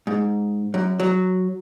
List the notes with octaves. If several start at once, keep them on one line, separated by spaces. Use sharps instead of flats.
G#2
F#2
F#3